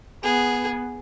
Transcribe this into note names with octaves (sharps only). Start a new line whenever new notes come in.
B3 G#4